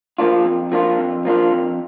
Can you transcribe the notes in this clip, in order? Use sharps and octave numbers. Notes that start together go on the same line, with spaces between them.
F3 A#3 D4 F4
F2
F3 A#3 D4 F4
F2
F3 A#3 D4 F4
F2